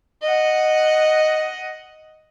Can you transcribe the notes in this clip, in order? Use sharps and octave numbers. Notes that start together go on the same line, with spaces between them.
D#5 F#5